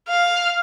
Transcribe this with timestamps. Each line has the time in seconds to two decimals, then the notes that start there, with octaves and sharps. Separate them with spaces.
0.08 F5